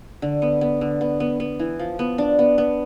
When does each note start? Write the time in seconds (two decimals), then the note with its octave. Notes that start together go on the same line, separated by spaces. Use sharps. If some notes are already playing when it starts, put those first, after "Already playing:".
0.22 D3
0.42 B3
0.61 B3
0.81 D3
1.01 B3
1.20 B3
1.40 B3
1.59 E3
1.79 F3
1.99 B3
2.18 D4
2.39 B3
2.58 B3